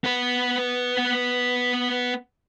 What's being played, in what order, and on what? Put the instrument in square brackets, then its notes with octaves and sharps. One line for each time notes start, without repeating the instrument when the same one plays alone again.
[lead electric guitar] B3 B4